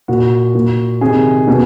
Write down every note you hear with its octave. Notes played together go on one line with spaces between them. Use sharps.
A#2 F#4
A#2
C3 D#3 G#4
B2